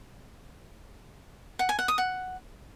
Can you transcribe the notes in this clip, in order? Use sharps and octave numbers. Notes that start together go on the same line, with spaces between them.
F#5
G#5
F#5
D#6
F#5